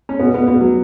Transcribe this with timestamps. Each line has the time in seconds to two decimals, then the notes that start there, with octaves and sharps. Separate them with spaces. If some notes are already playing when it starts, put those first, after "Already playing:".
0.09 C#4
0.19 B2 B3
0.34 B2 B3
0.47 B2 B3
0.61 F#3